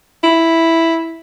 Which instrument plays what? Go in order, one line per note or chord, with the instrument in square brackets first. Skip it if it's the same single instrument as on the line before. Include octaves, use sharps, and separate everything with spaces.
[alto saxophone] E4